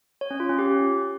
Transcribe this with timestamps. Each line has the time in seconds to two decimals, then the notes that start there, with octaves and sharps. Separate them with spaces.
0.21 C#5
0.31 C#4
0.40 F4
0.49 C#4
0.59 G4